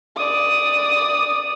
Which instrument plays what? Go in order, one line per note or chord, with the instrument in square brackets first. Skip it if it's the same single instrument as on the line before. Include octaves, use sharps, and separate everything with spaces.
[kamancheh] D5 D#6